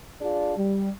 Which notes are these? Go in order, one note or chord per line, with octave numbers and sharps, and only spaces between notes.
D4 F4 G#4 D5
G3